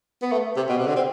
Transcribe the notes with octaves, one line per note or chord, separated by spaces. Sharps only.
B3
A3
C3
B2
C3
D3
C4